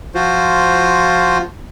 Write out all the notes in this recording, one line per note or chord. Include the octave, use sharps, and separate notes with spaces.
F3 F4 F#4 C5